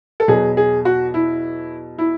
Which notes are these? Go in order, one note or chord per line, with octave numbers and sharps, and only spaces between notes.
A4
E2 B2 F#3 G#4
G#4
F#4
E4
E4